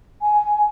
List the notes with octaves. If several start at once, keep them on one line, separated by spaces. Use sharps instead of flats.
G#5